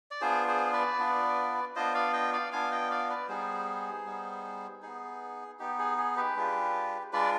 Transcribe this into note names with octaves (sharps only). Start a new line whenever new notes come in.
D5
B3 D4 F4 G#4 C5
G#4 C5
B4 D5
B3 D4 F4
B3 D4 F4 C5 D#5
D5 F5
D#5 G5
D5 F5
B3 D4 F4 F5 G#5
D#5 G5
D5 F5
B4 D5
G3 B3 D#4 G#4 C5
G3 B3 D#4
B3 D#4 G#4
B3 D#4 G4
G#4
G#4
G4 B4
G#3 D4 F4
G#3 D4 F4 B4 D5